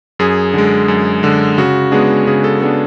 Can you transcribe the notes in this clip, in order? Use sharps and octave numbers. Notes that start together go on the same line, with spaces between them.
F#2 G#4
D3 G#3
F#2
D3 G#3
C#3 F#4
G#3 B3 D4 G#4
C#3 G#4
A4
G#3 B3 D4 A4